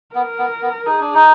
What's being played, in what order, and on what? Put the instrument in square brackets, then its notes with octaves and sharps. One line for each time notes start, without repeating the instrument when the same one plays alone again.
[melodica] B3 [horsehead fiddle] A#4
[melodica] B3
B3
[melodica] D#4 [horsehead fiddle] G#4
[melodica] D4
D#4